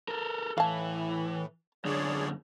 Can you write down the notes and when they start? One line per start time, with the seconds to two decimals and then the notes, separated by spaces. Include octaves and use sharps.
0.08 A4 A#4
0.58 A2 E3 F5 A5
1.85 F#2 D3 G#4 C#5 D5